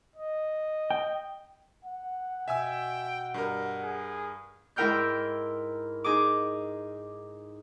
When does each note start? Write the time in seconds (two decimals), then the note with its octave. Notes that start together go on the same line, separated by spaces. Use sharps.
0.16 D#5
0.91 G5
1.85 F#5
2.48 B2 E5 G5 G#5 E6
3.34 G2 A#4
3.82 G#4
4.76 G#2 E4 A#4 G5 F6 G6
6.04 D#4 G#4 D6